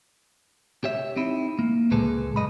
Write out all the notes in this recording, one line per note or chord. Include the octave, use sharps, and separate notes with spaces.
G4 C#5 E5
C4 D#4 E4
A#3
C#2 A#2 G#3 G#4 A4 B4
F#2 D#5 B5